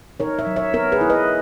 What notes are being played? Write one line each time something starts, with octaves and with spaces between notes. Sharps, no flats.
D#4 A#4 C#5
C#5 E5
F#3
C#5 E5
B3 A#4 C#5
G#4 B4
E4
B4 D#5